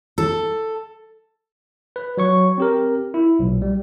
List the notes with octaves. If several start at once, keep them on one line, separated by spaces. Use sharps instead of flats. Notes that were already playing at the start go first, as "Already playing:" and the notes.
A4
B4
F#3 C#5 C#6
C4 G4 A#4
E4
B1 A#2
G3